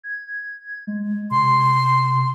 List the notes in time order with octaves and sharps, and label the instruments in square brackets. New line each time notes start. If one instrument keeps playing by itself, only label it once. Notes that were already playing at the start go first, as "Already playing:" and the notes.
[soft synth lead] G#6
G#3
[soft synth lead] C3 [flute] C6